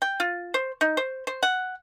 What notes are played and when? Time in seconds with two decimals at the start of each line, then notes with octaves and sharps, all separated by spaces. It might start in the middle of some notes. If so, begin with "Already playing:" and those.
0.02 G5
0.20 F4
0.54 C5
0.81 D#4
0.97 C5
1.27 C5
1.43 F#5